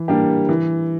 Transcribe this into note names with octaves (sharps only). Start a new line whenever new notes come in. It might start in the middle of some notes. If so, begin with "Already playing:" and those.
Already playing: E3
G3 A#3 D4 G4
E3